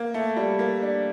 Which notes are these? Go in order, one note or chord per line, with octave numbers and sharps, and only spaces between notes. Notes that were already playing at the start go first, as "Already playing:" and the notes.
Already playing: A#3
A3
G3
A#3
D4